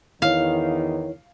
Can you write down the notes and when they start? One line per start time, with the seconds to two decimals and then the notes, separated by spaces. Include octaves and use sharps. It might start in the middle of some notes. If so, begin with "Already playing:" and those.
0.22 E2 D#3 E4 C#5 F5